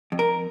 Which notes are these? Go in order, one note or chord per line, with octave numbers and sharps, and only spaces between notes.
F2
A#4